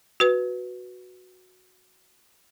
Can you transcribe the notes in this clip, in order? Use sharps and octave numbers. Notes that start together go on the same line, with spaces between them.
F#4 B4